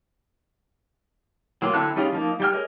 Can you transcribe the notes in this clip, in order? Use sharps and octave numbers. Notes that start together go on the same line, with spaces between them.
F#3 A#3 F4
D3 C4 E4 A4 F#6
G3 C#4 D#4 F4 G#4
F3 A#3 D#4
G3 G5 F6
G#4 A#4 C#5 D#5